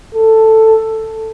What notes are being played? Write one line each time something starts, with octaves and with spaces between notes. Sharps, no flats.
A4